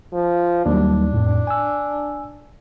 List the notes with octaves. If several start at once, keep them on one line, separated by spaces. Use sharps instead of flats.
F3
D#2 F#3 G3 D4
F2 A2
G#5 E6